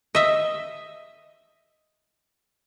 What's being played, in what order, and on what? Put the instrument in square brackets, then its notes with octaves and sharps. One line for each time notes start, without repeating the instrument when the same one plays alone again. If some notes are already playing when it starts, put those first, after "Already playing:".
[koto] D#5 E5